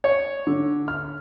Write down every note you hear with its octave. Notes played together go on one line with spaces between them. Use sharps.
C#5
D3
F6